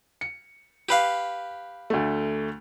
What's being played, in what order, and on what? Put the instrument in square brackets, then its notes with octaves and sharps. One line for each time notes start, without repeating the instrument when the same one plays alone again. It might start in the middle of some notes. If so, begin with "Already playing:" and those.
[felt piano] C#7
[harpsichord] G4 B4 F5
[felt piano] D2 A3